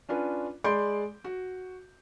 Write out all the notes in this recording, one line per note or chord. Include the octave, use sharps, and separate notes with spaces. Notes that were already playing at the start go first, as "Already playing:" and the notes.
C#4 D4 F4 B4
G#3 D5 B5 C6 G6 D7
F#4